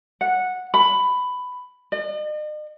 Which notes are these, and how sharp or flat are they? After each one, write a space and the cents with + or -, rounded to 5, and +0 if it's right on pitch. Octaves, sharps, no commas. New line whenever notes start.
F#5 -10
B5 +15
D#5 -45